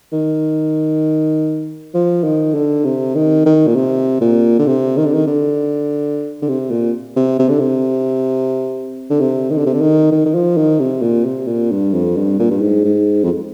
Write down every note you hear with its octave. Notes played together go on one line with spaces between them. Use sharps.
D#3
F3
D#3
D3
C3
D#3
D#3
A#2
C3
A#2
D3
C3
D#3
D3
D#3
D3
D3
C3
A#2
C3
C3
D3
C3
D3
C3
D#3
D3
C3
D3
D#3
D#3
D#3
F3
D#3
C3
A#2
C3
A#2
G2
F2
G2
A#2
G2
G#2
G#2
F2